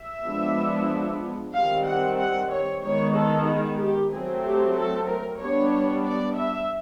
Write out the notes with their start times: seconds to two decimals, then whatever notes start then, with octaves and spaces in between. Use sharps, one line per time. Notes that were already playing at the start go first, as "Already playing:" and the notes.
Already playing: E5
0.26 F3 G#3 B3 D4
1.54 D#3 G3 C4 F5
1.86 F#5
2.18 F#5
2.51 C#5
2.83 D#3 G#3 B3 C#5
3.15 A4
3.48 G#4
3.80 G4
4.11 F#3 A3 C4 G#4
4.44 G4
4.76 A4
5.08 A#4
5.40 G3 B3 D4 C#5
6.05 D5
6.37 E5